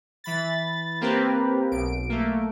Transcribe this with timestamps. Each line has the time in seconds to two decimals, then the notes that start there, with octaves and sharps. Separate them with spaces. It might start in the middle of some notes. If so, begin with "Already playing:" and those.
0.24 E3 B5 A6
1.01 A#3 C4 G4 A#4 B4
1.71 B1 D7
2.10 A3 A#3